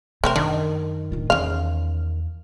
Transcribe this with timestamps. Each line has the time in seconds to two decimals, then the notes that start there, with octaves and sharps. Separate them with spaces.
0.24 C3 A3 C4 A#4
0.36 F#2 D#3 D4
1.12 D1 F4
1.30 E2 C#3 F5